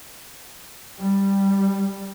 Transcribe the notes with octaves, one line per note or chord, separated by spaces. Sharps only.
G3